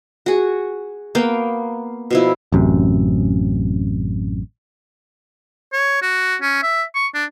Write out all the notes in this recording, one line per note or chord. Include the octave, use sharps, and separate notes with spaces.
F#4 G#4
A#3 B3 F5 G5
B2 F3 E4
A1 F#2 C3
C#5
F#4
C#4
E5
C#6
D4